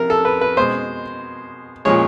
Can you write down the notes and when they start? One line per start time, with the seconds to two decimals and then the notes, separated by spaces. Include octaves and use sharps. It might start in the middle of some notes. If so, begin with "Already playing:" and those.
Already playing: F2 C3 A#4
0.10 A4
0.25 B4
0.41 B4
0.57 B2 G#3 C5
1.85 A#2 F3 G#3 C#5